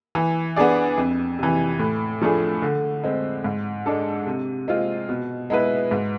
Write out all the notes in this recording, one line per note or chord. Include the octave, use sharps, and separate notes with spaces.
E3
B3 D4 G#4 D5
F2
C3 E3
A2
F3 A3 D4 G#4
D3
G#3 C4
G#2
G#3 D4 A4
C3
G#3 C4 F4
B2
G#3 B3 E4 B4
G#2